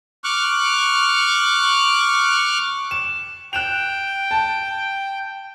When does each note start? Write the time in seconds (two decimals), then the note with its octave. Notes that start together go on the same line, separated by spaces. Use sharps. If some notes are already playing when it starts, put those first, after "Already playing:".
0.24 C#6 D6 F6 F#6
2.91 E7
3.53 G5 F#6 E7 F7
4.31 A5